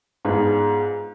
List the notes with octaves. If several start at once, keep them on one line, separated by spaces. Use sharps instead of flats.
G#2 G#3 B3 D4 F4 G#4